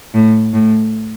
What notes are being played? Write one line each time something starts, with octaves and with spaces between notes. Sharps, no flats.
A2
A2